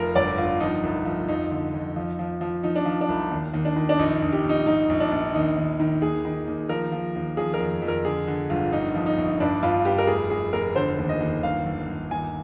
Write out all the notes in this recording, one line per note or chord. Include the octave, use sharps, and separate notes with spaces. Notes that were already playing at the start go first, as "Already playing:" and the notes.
Already playing: F1 F3 A#4
G1 D5
G1 F4
F3 D#4
C2
F3
F2 D#4
D3
F2
F3
F3
F3
F3 D#4
D4
F3
D4
C2
D#2
D#2
D4
D#3
D4
A#1 D#4
A#1
G4
A#1
D#4
G#2 D#4
A#1
D4
A#1
D#2 D#4
D#2
D#3
D#2 G#4
D#3
D#2
F3 A#4
F3
D#2
F3 G#4
A#4
F2
F2
A#4
D3 G#4
D3
G1 F4
A#1 D#4
F3
D#4
A#1
G2 D4
G2 F4
G2 G4
A#4
F1 G#4
F1 G#4
F1 A#4
D3 C5
D#2
D#5
D#2
G1 F5
G1
G1
D#2 G#5